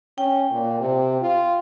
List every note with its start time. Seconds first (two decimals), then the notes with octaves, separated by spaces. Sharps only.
0.18 C#4 G5
0.51 A#2
0.80 C3
1.21 F4